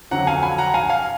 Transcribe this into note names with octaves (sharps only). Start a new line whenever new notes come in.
F2 D3 F#3 F#5 A#5
F5 G#5
G#5 B5
F#5 A#5
F5 G#5
F5 G#5